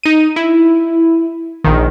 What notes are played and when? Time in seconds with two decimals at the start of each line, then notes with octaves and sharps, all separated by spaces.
0.03 D#4 D#7
0.36 E4
1.64 A#1 D#3